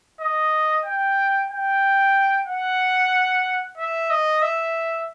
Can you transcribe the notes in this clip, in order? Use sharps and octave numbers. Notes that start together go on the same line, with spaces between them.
D#5
G5
G5
F#5
E5
D#5
E5